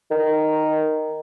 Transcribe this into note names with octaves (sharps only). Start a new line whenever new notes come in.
D#3